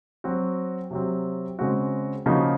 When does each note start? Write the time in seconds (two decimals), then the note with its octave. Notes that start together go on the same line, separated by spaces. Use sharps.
0.24 F#3 C4 F#4
0.91 C3 F#3 C4
1.59 C#3 G#3 C4 F#4
2.26 C#3 F3 A#3 D#4 F#4